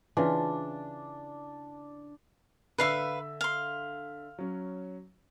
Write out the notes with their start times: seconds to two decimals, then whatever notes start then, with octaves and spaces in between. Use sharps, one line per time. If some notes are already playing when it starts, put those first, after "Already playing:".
0.17 C#3 E3 D4 F4
2.78 D3 B4 E5 F5 C#6 E6
3.41 F5 C6
4.39 F#3 C#4